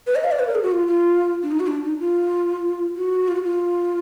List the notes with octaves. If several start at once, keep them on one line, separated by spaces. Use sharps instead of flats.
B4
D#5
F5
D5
B4
A#4
G#4
F#4
F4
F4
D4
D#4
F#4
D4
D#4
F4
F#4
F4
F#4
F4